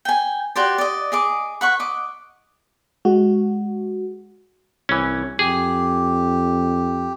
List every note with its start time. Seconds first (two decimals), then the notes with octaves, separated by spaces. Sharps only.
0.05 G5 G#5
0.56 F#4 G4 C5 D5
0.78 D5 D#5
1.12 G#4 D#5 D6
1.61 B4 F#5 C#6
1.80 D#5 D6
3.05 G#3 F#4
4.89 C2 E3 C#4
5.39 F2 G4 G#4